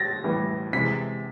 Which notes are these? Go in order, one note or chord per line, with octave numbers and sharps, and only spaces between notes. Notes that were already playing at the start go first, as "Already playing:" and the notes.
Already playing: A6 A#6
A2 E3 G3
C3 E3 G#3 B6